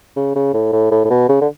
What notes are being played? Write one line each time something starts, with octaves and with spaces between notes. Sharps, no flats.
C#3
C#3
A2
A2
A2
A2
B2
C#3
D3